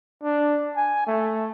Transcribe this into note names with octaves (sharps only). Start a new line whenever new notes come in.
D4
G#5
A3